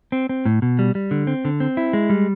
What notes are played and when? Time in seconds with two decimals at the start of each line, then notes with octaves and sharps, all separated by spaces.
0.12 C4
0.29 C4
0.46 A2
0.62 B2
0.79 G3
0.95 G3
1.11 D3
1.27 C4
1.45 D3
1.60 C4
1.77 E4
1.93 G#3
2.10 G3